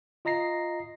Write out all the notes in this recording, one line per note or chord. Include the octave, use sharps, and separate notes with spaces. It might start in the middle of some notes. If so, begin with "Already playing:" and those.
F4 D#5 A#5 A#6 C7